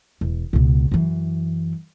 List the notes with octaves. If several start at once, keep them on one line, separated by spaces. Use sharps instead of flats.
E1
C#2 B2
F#2 E3